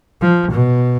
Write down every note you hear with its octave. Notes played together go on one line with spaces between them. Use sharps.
F3
B2